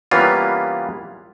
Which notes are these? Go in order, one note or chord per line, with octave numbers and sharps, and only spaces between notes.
E3 G3 A#3 B3 C#4 F4